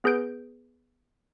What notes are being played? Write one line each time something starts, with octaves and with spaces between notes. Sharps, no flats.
B3 G#4 B4 G6 D7